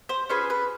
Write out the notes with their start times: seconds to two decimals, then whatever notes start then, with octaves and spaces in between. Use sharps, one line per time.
0.09 C5
0.29 C#4 F4 G#4 B4
0.50 B4